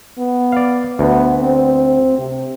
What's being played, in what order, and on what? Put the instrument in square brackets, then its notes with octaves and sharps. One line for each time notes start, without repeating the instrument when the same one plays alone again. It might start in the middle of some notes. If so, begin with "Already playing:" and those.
[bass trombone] B3
[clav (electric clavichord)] D5 F5
[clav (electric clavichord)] D2 [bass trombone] B3
[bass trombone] C4
C3